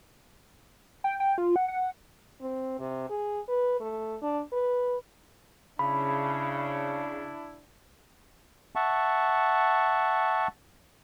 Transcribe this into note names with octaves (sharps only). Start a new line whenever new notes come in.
G5
G5
F4
F#5
F#5
C4
C3
G#4
B4
A3
D4
B4
C#3 D4 E4 B5
E5 F#5 A5 C#6